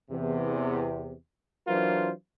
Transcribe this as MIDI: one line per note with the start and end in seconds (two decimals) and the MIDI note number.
0.10 1.12 40
0.10 1.12 48
1.68 2.11 52
1.68 2.11 54
1.68 2.11 62
1.68 2.11 65
1.68 2.11 70
1.68 2.11 72